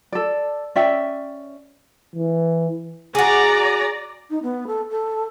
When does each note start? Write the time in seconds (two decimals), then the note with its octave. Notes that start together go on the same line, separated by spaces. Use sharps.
0.12 A4 D5
0.76 C#4 D5 E5 G5
2.16 E3
3.15 F#4 G#4 D5 A#5
4.30 D#4
4.43 B3
4.67 A4
4.90 A4